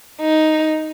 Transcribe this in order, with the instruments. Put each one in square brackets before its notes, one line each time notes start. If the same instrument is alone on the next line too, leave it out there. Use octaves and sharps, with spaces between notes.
[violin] D#4